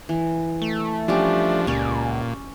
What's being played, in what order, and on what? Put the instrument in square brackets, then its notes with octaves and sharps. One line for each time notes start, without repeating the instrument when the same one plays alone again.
[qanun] E3
[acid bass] A3
[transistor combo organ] F3 D4 [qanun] G3 C#4 G4
[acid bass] C#2 [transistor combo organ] A#2 [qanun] C#4 D5